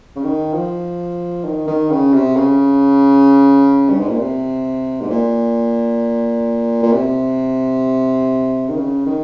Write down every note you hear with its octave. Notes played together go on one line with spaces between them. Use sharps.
C#3
D#3
F3
D#3
D#3
C#3
C3
C#3
G2
G#2
A#2
C3
G#2
A#2
A#2
C3
D#3
C#3
D#3